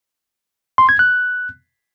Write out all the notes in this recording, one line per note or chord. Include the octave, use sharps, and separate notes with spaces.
C6
G#6
F#6